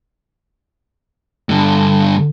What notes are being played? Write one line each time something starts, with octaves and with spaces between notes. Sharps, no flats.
G2 D3